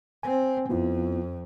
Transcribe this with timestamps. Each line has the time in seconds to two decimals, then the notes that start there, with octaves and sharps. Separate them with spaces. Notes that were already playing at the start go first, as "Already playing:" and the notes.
0.23 C4 G#5
0.69 F2 B3 E4 F4